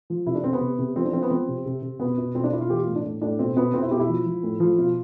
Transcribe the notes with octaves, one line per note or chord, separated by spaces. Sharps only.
F3
C3 E4
D4
C3 C4
B3
C3
C3
F3 C4
D4
F3 C4
B3
F3 C4
C3
C3
C3
B2 B3
B2
B2 C4
D4
B2 E4
F4
E3 G4
F4
A2
D4
A2
A2 D4
B2 C4
B2 B3
B2 C4
E4
B2 G4
E4
F3
F3
A2
F3
B2 F4